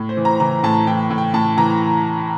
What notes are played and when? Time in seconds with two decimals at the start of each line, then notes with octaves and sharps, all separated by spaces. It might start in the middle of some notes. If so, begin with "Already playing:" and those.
Already playing: A2
0.09 C5
0.17 E3
0.25 A#5
0.40 E3 A#5
0.63 A2 A5
0.87 E3 G5
1.10 A2
1.18 G5
1.34 A2 A5
1.57 E3 A#5